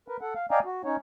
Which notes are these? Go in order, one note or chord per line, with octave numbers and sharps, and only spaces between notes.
A#4 B4
A4 F#5
F5
D5 D#5 F5 G5 G#5 A#5
F#4
C#4 D#4 C#5